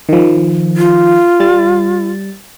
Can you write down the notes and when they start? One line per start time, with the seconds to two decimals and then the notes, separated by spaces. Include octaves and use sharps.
0.09 D#3 F3
0.77 F4
1.40 G3 A6